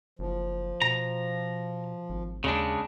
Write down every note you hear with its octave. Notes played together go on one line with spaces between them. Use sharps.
F#1 F3
B2 A#5
G#1
D#2 C#3 G#3 D4